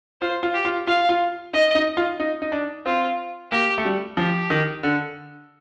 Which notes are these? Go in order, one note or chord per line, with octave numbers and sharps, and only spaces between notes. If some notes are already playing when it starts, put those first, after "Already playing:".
F4 C5
F4
G4
F4
F4 F5
F4
D#4 D#5
D#4
F4
D#4
D#4
D4
C4 F4
A#3 G4
A3
G3
F3 G4
D#3
D3